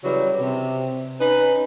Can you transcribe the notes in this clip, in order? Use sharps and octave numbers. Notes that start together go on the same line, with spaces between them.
C#3 E3 F#3 G3
C3
C#4 D#4 B4